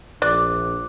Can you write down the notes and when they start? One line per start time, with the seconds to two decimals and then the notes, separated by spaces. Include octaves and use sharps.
0.22 A#1 D5 D6 F#6